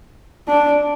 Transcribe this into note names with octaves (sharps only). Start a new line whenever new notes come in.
D4